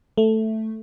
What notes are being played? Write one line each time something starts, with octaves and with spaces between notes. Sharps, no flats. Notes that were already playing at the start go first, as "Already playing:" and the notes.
A3